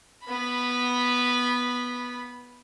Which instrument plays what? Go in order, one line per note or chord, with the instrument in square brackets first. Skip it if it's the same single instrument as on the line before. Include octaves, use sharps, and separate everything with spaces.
[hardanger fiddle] B3 B5